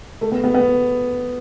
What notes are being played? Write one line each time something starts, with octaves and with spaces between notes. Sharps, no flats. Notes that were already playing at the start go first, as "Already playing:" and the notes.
A3
B3
B3
B3